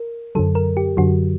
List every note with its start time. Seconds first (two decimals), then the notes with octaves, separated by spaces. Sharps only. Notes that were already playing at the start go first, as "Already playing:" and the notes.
Already playing: A#4
0.35 F#2 D3 F#3 A4
0.55 A#4
0.77 G4
0.97 F#2 D3 F#3 F#4